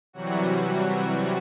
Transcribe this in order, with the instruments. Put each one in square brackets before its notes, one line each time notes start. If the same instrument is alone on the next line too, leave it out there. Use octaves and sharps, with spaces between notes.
[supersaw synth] C3 E3 F#3 G3 F#4